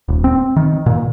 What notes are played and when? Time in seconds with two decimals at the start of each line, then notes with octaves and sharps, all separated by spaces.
0.08 D#1
0.24 C4
0.56 D#3
0.86 A#2